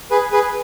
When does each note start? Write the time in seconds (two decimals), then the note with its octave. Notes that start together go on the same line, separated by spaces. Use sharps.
0.11 G#4 B4
0.32 G#4 B4